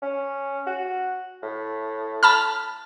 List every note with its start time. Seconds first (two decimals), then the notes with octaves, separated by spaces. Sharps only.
0.02 C#4
0.67 F#4
1.43 A2
2.23 A5 B5 F6